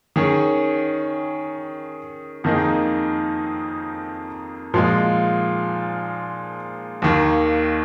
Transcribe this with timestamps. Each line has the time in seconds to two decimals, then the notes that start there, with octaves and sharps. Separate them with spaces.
0.16 D#3 C#4 G#4
2.44 F2 D#3 A#3 D#4 G#4
4.74 A#2 F3 G#3 F4
7.02 D#2 D#3 A#3